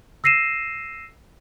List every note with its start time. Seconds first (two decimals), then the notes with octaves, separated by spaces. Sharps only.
0.24 E6 A#6 C7 D#7 E7